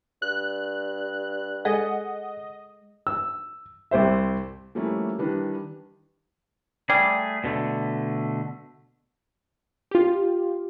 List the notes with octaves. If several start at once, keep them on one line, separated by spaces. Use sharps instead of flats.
G2 F#6
G#3 G#4 A4 D#5 F#5
E6
C2 G4 C5 E5
F3 G3 A3 A#3 C#4 E4
D#3 E3 G3 D4 B4
G3 A3 G#4
B2 D3 A3
F4 G4